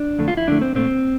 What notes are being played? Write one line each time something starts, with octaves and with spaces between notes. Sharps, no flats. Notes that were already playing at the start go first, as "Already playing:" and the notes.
Already playing: D4
F2 D3 A3
F4
E4
F2 D3 A3 D4
C4
A#2 A3 C4